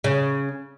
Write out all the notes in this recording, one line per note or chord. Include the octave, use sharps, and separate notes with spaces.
C#3